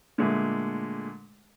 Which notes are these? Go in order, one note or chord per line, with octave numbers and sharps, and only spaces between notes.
A#2 D3 G#3 A3